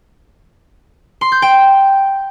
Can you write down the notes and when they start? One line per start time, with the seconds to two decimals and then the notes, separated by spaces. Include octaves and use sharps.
1.21 C6
1.32 G6
1.42 G5